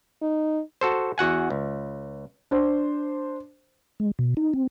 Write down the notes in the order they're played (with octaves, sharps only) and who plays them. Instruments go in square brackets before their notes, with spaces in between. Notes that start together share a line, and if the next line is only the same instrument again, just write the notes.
[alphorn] D#4
[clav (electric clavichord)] F#4 A4 C5
E2 F#4 F#5 G#5
C#2
[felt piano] D4 C5
[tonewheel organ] G#3
B2
D#4
C4